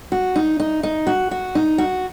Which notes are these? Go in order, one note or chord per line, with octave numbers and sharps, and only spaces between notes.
F#4
D#4
D#4
D#4
F#4
F#4
D#4
F#4